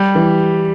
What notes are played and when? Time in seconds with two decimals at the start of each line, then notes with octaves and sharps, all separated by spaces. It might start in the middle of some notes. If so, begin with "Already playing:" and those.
Already playing: G3 G4
0.15 E3